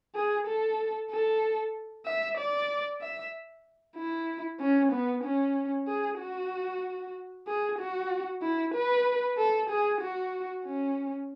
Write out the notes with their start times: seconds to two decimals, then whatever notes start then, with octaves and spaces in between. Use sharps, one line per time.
0.15 G#4
0.47 A4
1.11 A4
2.06 E5
2.38 D5
3.01 E5
3.96 E4
4.60 C#4
4.92 B3
5.24 C#4
5.87 G#4
6.19 F#4
7.47 G#4
7.79 F#4
8.42 E4
8.74 B4
9.38 A4
9.70 G#4
10.01 F#4
10.65 C#4